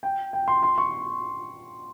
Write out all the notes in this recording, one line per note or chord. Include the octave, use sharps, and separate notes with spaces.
G5
G5
C6
C6
C#6